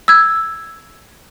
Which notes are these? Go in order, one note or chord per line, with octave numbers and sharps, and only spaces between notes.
E6 G#6